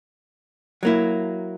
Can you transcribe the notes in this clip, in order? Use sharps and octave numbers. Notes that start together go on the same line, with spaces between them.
F#3 A#3 E4